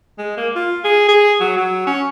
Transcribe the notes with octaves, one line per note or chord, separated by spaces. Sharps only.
G#3
A#3
F4
G#4
G#4
F#3
F#3
C#4